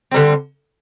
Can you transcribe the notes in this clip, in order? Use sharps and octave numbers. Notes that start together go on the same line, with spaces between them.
D3 G3 C4